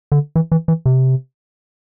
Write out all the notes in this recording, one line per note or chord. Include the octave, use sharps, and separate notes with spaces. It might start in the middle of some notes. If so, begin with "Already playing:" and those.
D3
E3
E3
E3
C3